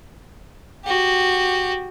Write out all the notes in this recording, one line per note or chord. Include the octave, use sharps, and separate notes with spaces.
F#4 G4